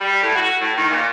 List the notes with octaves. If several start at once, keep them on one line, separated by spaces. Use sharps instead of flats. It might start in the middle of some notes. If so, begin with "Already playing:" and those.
G3
A2
F#4
A2
D#3
A#2